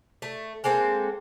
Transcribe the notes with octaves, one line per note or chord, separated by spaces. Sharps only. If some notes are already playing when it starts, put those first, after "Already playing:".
A3
G#3 A#3 C4 A4